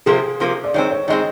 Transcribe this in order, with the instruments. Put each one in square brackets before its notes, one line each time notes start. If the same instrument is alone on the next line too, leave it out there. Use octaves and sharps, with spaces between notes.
[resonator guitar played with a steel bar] C3 F3 A#3 [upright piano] G#4
[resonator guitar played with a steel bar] C3 F3 A#3
[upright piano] D5
[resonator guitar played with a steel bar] D#3 G#3 C4 [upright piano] C#5
[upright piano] C#5
[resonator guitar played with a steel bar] D#3 G#3 C4 [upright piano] D#5